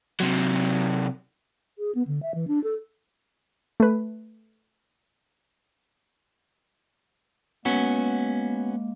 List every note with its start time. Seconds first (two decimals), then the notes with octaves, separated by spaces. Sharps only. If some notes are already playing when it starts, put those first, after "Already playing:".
0.20 C3 F#3
1.79 G#4
1.95 B3
2.07 D3
2.22 E5
2.35 E3
2.48 D4
2.64 A4
3.80 A3 B4
7.65 G#3 A#3 B3 C#4 F#4